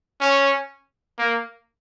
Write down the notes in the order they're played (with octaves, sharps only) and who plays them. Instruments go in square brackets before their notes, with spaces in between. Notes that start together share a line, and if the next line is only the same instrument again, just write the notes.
[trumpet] C#4
A#3